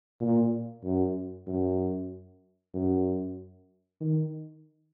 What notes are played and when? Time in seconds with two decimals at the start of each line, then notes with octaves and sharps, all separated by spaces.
0.21 A#2
0.84 F#2
1.47 F#2
2.74 F#2
4.01 D#3